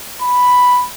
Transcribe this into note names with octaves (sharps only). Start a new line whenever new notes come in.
B5